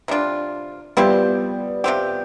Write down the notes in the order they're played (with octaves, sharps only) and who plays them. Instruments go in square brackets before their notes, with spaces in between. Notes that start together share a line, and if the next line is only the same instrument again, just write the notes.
[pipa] C3 G3 D4 F4
[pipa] F3 C4 E4 G4 [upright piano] G3 B3
[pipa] C3 F3 C4 G4